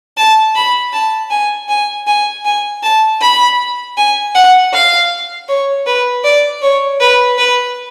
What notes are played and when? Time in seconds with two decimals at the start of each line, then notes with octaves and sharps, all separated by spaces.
0.17 A5
0.55 B5
0.93 A5
1.31 G#5
1.69 G#5
2.07 G#5
2.45 G#5
2.83 A5
3.21 B5
3.97 G#5
4.35 F#5
4.73 F5
5.48 C#5
5.86 B4
6.24 D5
6.62 C#5
7.00 B4
7.38 B4